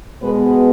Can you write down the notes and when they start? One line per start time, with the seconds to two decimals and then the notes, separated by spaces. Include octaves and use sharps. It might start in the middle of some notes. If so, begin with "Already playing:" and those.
0.22 B2 G#3 B3 B4